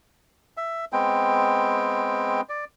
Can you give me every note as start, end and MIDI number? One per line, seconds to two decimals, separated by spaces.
0.57 0.85 76
0.93 2.41 56
0.93 2.41 59
0.93 2.41 60
0.93 2.41 79
2.49 2.65 74